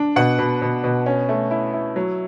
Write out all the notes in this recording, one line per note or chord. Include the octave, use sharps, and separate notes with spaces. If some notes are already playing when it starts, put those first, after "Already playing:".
Already playing: D4
B2 F#5
B2
B2
B2
C#4
A3
E4
E4
F#3